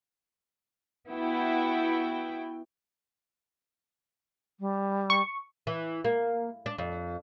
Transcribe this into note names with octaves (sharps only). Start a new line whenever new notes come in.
B3 E4 F#4 G5
G3
C#6
E3
A#3
D4
F2